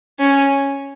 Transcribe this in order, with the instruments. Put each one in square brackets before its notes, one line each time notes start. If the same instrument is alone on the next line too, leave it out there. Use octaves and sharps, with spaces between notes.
[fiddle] C#4